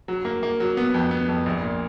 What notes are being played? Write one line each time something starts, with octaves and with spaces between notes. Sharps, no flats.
F#3
A#3
A#3
F#3
B3
F2
B3
F2
A#1
A#2